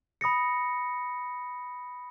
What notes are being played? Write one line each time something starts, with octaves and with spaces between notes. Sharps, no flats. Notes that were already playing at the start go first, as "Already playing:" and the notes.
B5 D#6 A#6 C#7